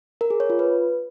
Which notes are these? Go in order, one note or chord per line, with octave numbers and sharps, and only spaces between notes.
A#4
G#4
C#5
F4
B4